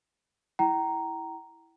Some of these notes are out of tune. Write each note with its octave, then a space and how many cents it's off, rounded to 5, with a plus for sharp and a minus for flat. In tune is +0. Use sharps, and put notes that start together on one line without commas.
E4 +0 G5 -40 A#5 +0